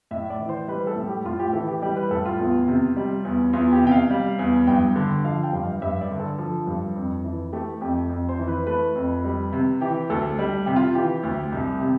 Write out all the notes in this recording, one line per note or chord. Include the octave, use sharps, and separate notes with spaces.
A2 E5
D5
E3
C5
G3 B4
A4
A2
G4
A2 F4
G4
E3 A4
G4
G3 G4
B4
A2 A4
F4
E2
C3
G3
E2
E2 F4
G4
C3 G5
F5
G3
E2
G2 G5
D3
F3 F5
G5
G2
F5
G2 E5
D5
D3
A4
F3
G2
F2
E3
A3 G4
F2 G4
F2
C5
E3
B4
A3 B4
F2
G3
C3
E3 G4
D2 A4
G3
C3 G4
F4
E3 G4
D2
C2
C3